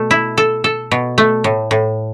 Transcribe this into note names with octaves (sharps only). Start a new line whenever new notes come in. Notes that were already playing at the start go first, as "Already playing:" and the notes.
Already playing: B2 A3
E4
A4
A4
B2
A3
A2
A2